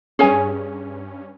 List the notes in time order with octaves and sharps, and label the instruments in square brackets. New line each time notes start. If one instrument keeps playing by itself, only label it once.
[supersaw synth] G2 C#4 [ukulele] G#4 C#5 G#5